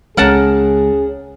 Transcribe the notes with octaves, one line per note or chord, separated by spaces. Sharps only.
C#2 G#3 C#4 G#4 A#4 F#5 A5